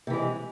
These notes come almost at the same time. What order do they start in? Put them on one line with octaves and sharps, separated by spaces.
C3 E3 G#3